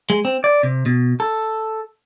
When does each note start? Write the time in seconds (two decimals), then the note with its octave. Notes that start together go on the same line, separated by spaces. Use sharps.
0.10 G#3
0.25 C4
0.44 D5
0.63 C3
0.86 B2
1.20 A4